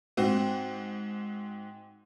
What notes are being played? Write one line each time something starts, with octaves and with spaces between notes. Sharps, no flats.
G#2 C4 F#4